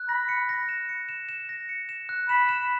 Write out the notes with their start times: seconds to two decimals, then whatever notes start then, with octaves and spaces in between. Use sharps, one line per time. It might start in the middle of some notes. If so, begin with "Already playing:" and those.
Already playing: F#6
0.09 B5 A#6
0.29 C#7
0.49 A#6
0.69 E7
0.89 C#7
1.09 E7
1.29 E7
1.49 A#6
1.69 C#7
1.89 E7
2.09 F#6
2.29 B5 E7
2.49 E7